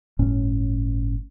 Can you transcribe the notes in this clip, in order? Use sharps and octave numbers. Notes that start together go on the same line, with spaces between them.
G1 A2 C#4